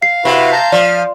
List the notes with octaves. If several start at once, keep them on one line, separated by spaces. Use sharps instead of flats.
F5 C7
C3 E4 F#4 B4
A5 A#5 G6
F3 D5 F6